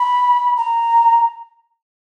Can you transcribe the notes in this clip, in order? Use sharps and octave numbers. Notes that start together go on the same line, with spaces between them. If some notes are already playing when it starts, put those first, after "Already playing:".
Already playing: B5
A#5